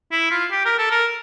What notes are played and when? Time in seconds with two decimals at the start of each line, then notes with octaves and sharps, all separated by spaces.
0.12 E4
0.31 F4
0.52 G4
0.65 A#4
0.78 A4
0.91 A#4